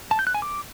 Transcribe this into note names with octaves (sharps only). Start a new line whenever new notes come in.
A5
G6
F#6
G#5
D6